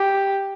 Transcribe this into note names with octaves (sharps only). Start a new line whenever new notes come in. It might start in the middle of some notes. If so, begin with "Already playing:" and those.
Already playing: G4